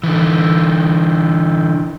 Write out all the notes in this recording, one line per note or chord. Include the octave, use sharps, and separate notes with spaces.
D3 E3